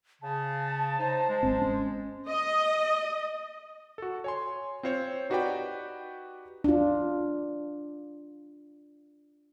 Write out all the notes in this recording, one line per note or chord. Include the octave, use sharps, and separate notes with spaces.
C#3 A5
D#4 C5
G#3
G#1 C4
C#4
D#5
F#4 A4
C#5 G#5 C6
C4 F4 C5 C#5
D#4 F#4 G4 B4 D5 G5
D4 F4